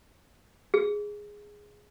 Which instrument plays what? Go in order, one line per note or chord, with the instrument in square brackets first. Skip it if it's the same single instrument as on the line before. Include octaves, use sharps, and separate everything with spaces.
[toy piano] G#4